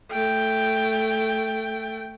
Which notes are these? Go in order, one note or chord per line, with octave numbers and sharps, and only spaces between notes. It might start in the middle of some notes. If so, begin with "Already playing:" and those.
A3 G5